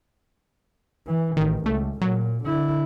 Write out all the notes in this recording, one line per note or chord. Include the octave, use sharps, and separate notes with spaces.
E3
A1 D#3
C#2 A3
A#2 F#3
D3 E4